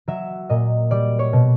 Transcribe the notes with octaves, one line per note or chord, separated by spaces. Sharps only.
F#3 E5
A#2 D#5
G3 D5
C#5
B2